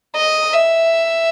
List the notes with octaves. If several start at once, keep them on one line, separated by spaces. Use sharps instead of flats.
D#5
E5